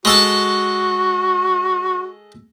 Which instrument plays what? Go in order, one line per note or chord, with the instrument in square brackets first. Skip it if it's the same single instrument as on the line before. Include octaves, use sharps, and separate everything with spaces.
[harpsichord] G#3 A4 A5 [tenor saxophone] F#4